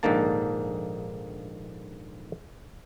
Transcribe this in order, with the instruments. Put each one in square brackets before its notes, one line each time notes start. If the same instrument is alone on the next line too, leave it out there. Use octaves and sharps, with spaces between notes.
[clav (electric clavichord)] A#1 G#2 D3 D#3 A#3 A5